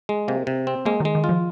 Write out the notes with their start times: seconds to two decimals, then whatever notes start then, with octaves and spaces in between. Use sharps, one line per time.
0.09 G#3
0.28 C3 A#3
0.47 C3
0.67 C4
0.85 G#3 A#3
1.00 D#3
1.05 G#3
1.15 D#3
1.24 F4
1.29 F3